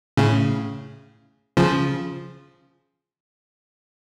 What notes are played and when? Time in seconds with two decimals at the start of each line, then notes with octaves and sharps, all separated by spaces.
0.17 A2 C#3
1.57 C#3 F3